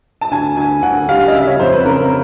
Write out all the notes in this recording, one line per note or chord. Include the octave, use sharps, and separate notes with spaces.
A5
D2 G#5
D2 G#5
D2 F#5
G3 F5
D#5
C#3 E5
C#5
F2 C5
B4
C#3 A#4